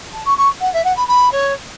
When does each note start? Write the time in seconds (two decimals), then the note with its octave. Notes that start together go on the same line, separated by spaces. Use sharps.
0.13 A5
0.25 C#6
0.37 C#6
0.61 F#5
0.73 E5
0.84 F#5
0.96 B5
1.07 B5
1.32 C#5